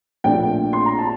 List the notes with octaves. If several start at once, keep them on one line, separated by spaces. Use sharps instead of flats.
A#1 A#2 A3 D4 G5
C6
A#5
A5